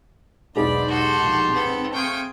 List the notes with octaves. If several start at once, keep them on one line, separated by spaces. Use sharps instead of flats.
B1 E2 G#2 D4 G#4 C5 D5 B5
F#4 G4 A4 A5 C6
A#1 F3
B3 C4 A4
A3 G#4 F5 G5 C#6